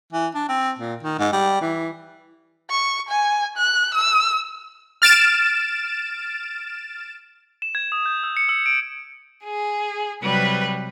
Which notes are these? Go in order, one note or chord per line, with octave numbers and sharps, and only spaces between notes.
E3
D4
C4
A#2
D#3
G#2
G3
E3
C#6
G#5
F#6
E6
F6 A6 D7 E7
E7
G#6
D#6
G6
E6
C#7
E6
D7
G#4
C3 F#3 G3 B4